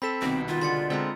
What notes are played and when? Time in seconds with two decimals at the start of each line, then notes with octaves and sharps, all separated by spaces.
0.02 C4 A4 B5 B6 E7
0.22 C2 B2 D#3 C4 D6
0.48 D#3 B3 F4
0.61 D3 G#3 C6 A6 C#7
0.90 D3 G#3 C4 A#4 D#5 E5